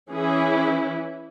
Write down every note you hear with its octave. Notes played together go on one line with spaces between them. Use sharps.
E3 C#4 E4 G#4